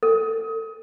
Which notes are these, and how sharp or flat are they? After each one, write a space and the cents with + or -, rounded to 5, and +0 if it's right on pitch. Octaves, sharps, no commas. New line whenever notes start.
A4 +25